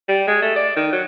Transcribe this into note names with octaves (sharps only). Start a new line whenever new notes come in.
G3
G#3
A3
D5
D#3
F#3